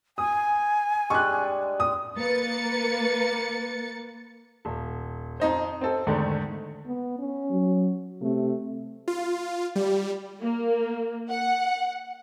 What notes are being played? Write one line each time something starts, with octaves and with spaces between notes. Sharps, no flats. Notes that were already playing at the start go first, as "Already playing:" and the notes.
G#5 D#6
G3 G#3 D4 C#6 F#6
D#6
A#3 A#4 B4 A6 C#7
D#1
F2 D#4 C5
C4 A4
E2 G#2 D3 D#3 A3
B3
C#4
F#3
C3 A3
F4
G3
A#3
F#5